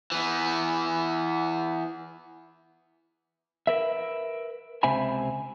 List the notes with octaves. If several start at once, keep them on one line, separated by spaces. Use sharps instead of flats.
E3 B3
A#4 B4 E5
C#2 C3 C5 E5 G#5 B5